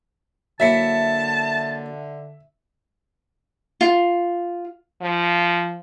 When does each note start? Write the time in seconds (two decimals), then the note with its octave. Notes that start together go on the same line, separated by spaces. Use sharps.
0.60 D3 F#3 A#3 E4 E5 A5 B6 C#7
3.81 F4
5.02 F3